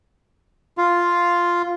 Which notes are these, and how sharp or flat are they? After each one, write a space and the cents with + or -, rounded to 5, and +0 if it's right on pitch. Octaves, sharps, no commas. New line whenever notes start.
F4 +0 F5 +0